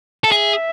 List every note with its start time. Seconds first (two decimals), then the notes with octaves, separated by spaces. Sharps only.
0.24 A4
0.31 G#4 E5